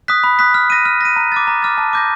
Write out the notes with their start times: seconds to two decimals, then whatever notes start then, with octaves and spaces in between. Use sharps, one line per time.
0.08 D#6 F#6 B6
0.24 B5
0.39 D#6 F#6 B6
0.54 F6
0.70 A#6 D#7
0.85 F6
1.01 A#6 D#7
1.16 A#5
1.32 D6 F6 A6
1.47 A#5
1.62 D6 F6 A6
1.78 A5
1.93 D6 G6 A#6